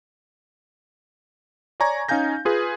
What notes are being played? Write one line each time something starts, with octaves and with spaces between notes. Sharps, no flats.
C#5 D5 G#5 A#5 C#6 G#6
C#4 D#4 F5 G#5 G6 A#6
F4 G#4 B4